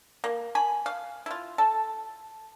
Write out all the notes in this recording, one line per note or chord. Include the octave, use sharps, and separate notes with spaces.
A#3
G#5 B5
F5
E4 F4
A4